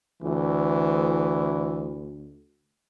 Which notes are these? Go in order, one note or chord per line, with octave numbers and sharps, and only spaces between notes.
D2 E3